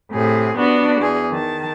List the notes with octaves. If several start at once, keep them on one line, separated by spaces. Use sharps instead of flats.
A2 C3 G#4
B3 D4 F#4
E2 G#4
D#3 A5